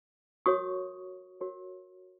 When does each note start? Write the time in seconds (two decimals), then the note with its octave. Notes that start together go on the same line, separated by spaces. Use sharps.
0.46 F#4 A#4 C#5 C#6 D#6
1.41 F#4 A#4 C#5